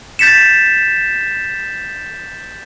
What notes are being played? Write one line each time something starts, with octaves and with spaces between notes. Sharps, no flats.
G6 A6 B6 C#7 E7